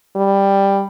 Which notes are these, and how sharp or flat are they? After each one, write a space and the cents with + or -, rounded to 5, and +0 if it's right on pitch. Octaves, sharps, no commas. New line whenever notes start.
G3 +10